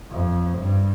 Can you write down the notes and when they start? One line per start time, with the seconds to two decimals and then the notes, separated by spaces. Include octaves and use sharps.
0.11 F2
0.59 G2